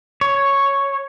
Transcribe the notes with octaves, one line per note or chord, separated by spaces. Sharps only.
C#5